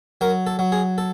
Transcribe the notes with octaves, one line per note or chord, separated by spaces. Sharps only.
F#3 A#4
A4
F#3
G#4
A4